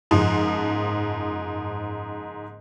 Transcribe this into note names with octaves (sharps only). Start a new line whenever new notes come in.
F#1 G#2 F3 C6